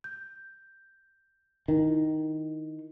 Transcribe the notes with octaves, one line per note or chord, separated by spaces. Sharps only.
G6
D#3 D#4 E4